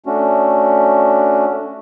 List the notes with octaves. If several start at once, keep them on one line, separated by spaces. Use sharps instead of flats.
A3 C#4 D4 F#4